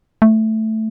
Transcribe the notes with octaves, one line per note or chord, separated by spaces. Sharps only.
A3